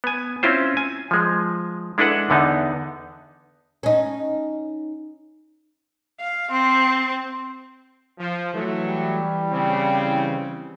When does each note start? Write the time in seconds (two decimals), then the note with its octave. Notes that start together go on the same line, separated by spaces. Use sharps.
0.04 B3 G#5
0.43 C4 C#4 E4 F4 C5
0.77 G#5
1.11 F3 G#3
1.98 G#3 D4 E4 A4 B4 F#5
2.30 E2 D3 B3 D#4
3.83 C#4 D#4
6.20 F5
6.51 C4 C6
8.18 F3
8.54 E3 F#3 A3
8.86 G3
9.51 C#3 C4